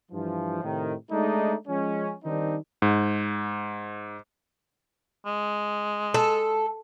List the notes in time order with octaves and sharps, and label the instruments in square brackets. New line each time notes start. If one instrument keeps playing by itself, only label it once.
[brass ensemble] G2 E3 F3
A2 C3 D#3
G#3 A3 D4 D#4
F3 G#3 C#4
D#3 G3 C4 D4 D#4
[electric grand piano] G#2
[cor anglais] G#3
[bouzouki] A4